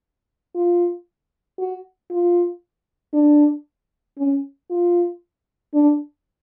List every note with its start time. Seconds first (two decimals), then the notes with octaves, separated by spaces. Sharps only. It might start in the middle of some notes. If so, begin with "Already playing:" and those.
0.55 F4
1.59 F#4
2.11 F4
3.14 D4
4.19 C#4
4.71 F4
5.74 D4